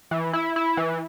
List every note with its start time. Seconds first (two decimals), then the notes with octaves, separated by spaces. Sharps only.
0.11 E3
0.33 E4
0.56 E4
0.77 E3